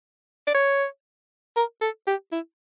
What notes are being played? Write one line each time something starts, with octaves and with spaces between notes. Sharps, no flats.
D5
C#5
A#4
A4
G4
E4